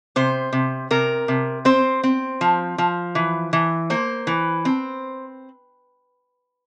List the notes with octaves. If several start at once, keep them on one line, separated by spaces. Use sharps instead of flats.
C3 C5
C3
C3 A#4
C3
C4 C5
C4
F3
F3
E3
E3
A#3 C5
E3
C4